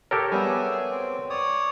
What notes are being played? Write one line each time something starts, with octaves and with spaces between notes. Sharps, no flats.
G4 A4 A#4 C#5
G3 B3 G#4 E5 G#5
C4
C#5 D5 D#6